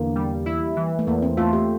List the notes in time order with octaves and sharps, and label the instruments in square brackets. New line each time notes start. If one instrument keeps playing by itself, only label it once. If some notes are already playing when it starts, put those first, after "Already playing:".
Already playing: [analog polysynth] E2 D3 [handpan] A#3
[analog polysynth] G3
E4
E3
[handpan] A3
[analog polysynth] E2 [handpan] A#3
[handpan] C4
[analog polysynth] A3 [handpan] F4
[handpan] G4